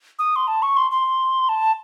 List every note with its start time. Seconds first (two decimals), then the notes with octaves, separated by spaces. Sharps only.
0.19 D#6
0.36 C6
0.48 A5
0.62 C#6
0.77 C6
0.91 C6
1.49 A5